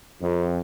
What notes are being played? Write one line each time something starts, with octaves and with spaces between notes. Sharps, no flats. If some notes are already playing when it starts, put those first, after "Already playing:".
F2